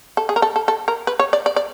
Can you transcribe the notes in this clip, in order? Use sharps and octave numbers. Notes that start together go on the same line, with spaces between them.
A4
G#4
A#4
A4
A4
A4
A#4
B4
C#5
D5
D5
D5